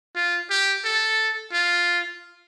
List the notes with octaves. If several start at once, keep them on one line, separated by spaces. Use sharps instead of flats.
F4
G4
A4
F4